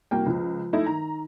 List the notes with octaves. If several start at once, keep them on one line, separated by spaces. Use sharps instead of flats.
C2 A#3 F#4 G5
C#2 F3
A3 D#4 E4
D#3 A#5